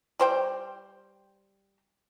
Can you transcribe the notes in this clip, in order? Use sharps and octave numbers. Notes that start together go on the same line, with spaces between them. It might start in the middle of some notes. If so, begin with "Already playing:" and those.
G3 C5 G5